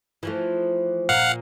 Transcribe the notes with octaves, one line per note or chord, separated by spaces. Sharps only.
E3 F3 A3
A#2 F5 F#5